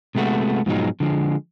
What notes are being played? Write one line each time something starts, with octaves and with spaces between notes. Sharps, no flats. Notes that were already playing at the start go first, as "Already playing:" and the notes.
C3 G#3 A3 B3 F#4
G#2 B2 F3 F#3 G#3 D#4
D3 F3 G#3